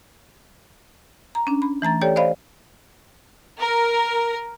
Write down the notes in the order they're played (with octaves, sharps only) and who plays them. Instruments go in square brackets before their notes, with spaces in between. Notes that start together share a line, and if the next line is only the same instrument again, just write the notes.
[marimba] A#5
C#4 D4
B5
E3 A3 A#5 A6
G4 A4 C#5 D5 G5
C5 D5 D#5 F5 B5
[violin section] A#4